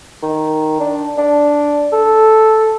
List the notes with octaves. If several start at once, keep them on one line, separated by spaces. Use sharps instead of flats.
D#3
D4
D4
A4